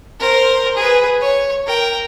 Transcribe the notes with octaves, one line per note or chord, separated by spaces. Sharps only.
A#4 C5
G#4 B4
C#5
A#4 G5